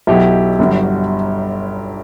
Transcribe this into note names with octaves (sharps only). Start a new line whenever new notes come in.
B1 B2 F#3 E4 G4
G1 G2 F#3